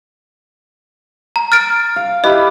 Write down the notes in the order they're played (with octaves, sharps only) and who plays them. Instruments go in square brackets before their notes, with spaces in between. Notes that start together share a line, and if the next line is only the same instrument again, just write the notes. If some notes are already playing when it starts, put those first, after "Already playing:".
[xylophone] A#5
F6 A6 D7
[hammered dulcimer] F5
[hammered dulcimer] E4 G4 B4 [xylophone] D#5